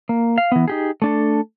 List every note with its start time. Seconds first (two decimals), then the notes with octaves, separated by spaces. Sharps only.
0.09 A#3
0.38 F5
0.52 E3 B3
0.68 D#4 G4 G#4
1.02 A3 D4 A4